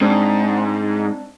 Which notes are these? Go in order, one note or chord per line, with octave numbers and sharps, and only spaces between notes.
G#2 C4 D4